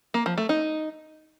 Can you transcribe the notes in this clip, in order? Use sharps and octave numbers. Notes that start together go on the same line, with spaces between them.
A#3
F3
A3
D#4